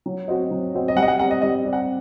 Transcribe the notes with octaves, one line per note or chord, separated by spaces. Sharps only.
F#3
C4 F#4 C5 D#5
F#3
C4 F#4 C5 D#5
D#5
G3 F#5
D#5
F#5
C4 G4 D5 F#5
D#5
G3 D#5
C4 G4 D5
F#5